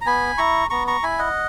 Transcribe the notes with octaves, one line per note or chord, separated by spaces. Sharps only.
A#5
B3 G#5 B5
E4 A#5 C#6
B3 A#5 C#6
A#5 C#6
E4 G#5 B5
D#5 F#5